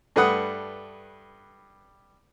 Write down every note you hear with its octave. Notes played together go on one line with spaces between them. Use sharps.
G2 A3 B4 F#5 D#6